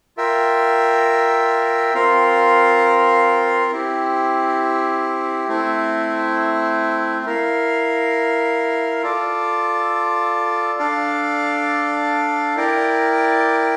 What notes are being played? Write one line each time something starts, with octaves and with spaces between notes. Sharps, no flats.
F4 A#4 E5 G5
C4 F4 A#4 F5
C4 E4 G4
A3 C4 E4
E4 A#4 F5
F4 A4 D5
D4 A4 D5 F5
E4 A#4 D5 G5